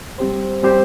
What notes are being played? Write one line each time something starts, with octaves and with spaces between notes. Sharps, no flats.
G3 C4 G4 C5
G3 C4 G4 C5